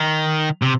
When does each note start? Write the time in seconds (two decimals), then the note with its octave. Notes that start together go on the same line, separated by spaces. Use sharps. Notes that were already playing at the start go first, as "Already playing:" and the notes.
Already playing: D#3
0.62 C3